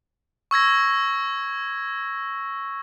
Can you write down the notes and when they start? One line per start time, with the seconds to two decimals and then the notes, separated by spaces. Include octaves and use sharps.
0.51 C#6 E6 G#6 A#6